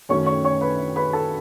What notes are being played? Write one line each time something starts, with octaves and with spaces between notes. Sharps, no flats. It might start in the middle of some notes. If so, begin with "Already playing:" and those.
F#2 D#3 A3 C#4 C#5 C#6
C#5 C#6
C#5 C#6
B4 B5
B4 B5
A4 A5